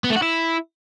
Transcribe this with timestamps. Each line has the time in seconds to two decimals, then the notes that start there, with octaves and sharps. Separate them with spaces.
0.04 B3
0.10 A3
0.16 F#4
0.22 E4